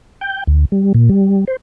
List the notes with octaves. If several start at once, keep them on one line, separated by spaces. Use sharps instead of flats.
G5
D2
G3
A#2
G3
C5